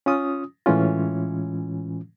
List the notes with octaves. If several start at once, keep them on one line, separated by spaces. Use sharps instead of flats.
C#4 F4 D#6
A2 E3 G#3 C#4 F4